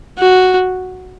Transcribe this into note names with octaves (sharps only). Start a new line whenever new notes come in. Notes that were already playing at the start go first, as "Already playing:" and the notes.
F#4